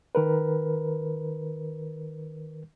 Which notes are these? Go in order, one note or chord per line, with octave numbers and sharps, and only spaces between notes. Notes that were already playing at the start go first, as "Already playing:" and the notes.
D#3 A#4 B4